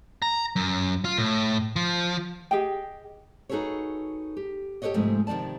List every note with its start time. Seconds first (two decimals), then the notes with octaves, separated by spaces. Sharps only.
0.22 A#5
0.56 F#2
1.05 F4
1.18 A2
1.76 F3
2.51 G4 G#4 D#5 G5
3.49 D#4 F#4 G#4 A4 B4 C#5
4.37 G4
4.82 G4 A4 B4 C#5 D#5
4.94 G#2 C3 F3 G#3 A3
5.27 C3 D#3 F3 D5 A5